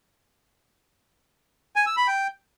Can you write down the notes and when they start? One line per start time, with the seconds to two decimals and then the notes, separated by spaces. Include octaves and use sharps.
1.76 G#5
1.86 E6
1.97 B5
2.07 G5